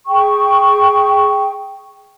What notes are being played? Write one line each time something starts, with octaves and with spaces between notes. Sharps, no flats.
G#4 G5 C#6